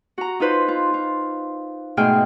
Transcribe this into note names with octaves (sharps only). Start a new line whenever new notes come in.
F#4 A#5
D#4 F4 B4 C5
F4
F4
G#2 B2 A3 G#4 G5 F6